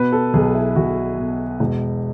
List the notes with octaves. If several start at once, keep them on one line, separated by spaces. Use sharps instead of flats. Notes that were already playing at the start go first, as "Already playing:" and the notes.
Already playing: B2 B4
A4
B1 G#4
E4
B1 F#4
B2
E1